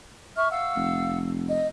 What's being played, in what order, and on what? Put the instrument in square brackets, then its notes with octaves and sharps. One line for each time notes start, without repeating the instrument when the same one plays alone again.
[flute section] E5 C#6 F6
F5 F#5 E6
[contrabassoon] F1
[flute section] D#5